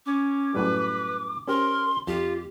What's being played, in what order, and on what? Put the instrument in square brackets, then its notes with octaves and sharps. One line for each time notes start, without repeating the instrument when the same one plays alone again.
[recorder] C#4 [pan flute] D6
[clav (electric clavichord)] F#2 A2 G3 [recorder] B4
[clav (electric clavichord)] C#4 G4 C5 [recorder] A#4 [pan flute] C6
[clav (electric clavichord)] F2 [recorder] F4 [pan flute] G4